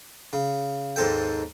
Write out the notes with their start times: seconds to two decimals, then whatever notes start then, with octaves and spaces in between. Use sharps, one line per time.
0.33 C#3
0.96 D#2 G#2 C4 A4 G5